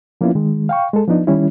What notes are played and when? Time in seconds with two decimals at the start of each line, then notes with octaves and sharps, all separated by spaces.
0.21 F3 A#3 B3 C#4 E4 F4
0.35 D#3 G#3
0.69 F5 G5 C#6
0.93 G#3 A4
1.08 F3 B3 D4 D#4
1.27 D#3 G3 C#4 E4